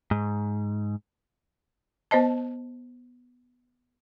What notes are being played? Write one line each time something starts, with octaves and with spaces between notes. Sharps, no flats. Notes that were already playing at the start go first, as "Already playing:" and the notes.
G#2
B3 C5 D#5 A5